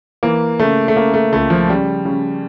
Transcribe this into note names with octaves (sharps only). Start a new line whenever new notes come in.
E3 A#3
C#3 A3
A3
C#3 A#3
A3
C#2 A3
F3
C#3 G3
C#3